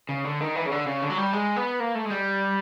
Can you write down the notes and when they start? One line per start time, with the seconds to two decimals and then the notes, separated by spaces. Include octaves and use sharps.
0.09 C#3
0.25 D3
0.40 D#3
0.55 E3
0.66 C#3
0.71 D3
0.86 C#3
1.02 D3
1.10 F#3
1.18 G3
1.33 G#3
1.56 B3
1.80 A#3
1.95 A3
2.05 G#3
2.11 G3